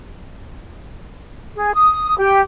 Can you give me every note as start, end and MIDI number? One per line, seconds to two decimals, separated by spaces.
1.56 1.72 68
1.74 2.16 87
2.18 2.41 67